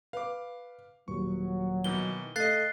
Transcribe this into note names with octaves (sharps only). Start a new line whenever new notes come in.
B4 F5 D6
D#1 F#3 C#6
B2 D#3 E3 G7
A3 D#5 F5 F#6 A6 C7